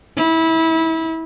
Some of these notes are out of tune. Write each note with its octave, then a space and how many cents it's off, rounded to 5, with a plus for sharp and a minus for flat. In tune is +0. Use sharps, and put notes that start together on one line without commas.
E4 -25